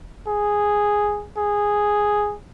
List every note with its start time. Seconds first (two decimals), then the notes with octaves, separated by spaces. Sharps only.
0.27 G#4
1.37 G#4